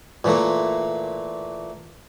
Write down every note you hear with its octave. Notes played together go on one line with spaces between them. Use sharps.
A#2 E3 A3 A#3